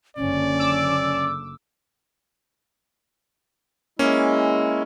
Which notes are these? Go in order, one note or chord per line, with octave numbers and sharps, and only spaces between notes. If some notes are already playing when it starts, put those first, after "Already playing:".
F#1 D3 C#4 D5
D6 E6
G#3 A#3 C#4 E4